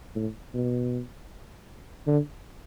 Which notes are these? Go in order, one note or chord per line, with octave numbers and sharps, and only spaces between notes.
A2
B2
D3